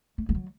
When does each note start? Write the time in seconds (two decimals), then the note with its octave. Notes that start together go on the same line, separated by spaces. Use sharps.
0.18 A3
0.29 A3
0.35 F#3